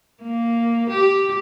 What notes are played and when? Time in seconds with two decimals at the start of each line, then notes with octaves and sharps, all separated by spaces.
0.23 A#3
0.89 G4